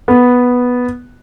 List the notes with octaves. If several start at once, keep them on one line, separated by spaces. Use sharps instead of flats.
B3